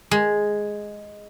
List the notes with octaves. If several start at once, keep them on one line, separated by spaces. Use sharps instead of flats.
G#3